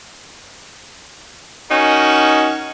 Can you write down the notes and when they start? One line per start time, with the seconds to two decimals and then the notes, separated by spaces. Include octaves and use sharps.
1.71 C#4 D#4 F#4 A#4